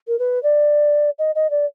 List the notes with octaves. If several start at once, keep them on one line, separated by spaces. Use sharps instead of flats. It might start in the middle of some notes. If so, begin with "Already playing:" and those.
A#4
B4
D5
D#5
D#5
D5